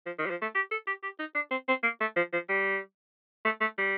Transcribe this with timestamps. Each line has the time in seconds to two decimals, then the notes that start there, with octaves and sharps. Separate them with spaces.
0.06 F3
0.18 D#3
0.26 G3
0.30 F3
0.42 A3
0.55 G4
0.71 A4
0.87 G4
1.03 G4
1.19 D#4
1.35 D4
1.51 C4
1.68 C4
1.83 A#3
2.00 A3
2.16 F3
2.33 F3
2.49 G3
3.45 A3
3.61 A3
3.78 G3